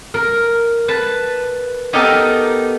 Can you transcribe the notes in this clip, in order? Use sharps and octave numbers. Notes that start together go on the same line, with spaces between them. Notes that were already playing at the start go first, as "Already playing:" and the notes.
A#4
B4 A5
B3 D#4 G4 A4 A#4 D#5